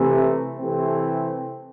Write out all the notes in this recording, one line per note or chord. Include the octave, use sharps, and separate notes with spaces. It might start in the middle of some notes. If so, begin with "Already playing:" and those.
Already playing: C3 E3 A3
C3 E3 A3 C4